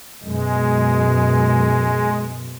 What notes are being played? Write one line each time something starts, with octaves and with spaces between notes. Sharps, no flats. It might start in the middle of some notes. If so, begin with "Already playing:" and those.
F#2 B2 G#3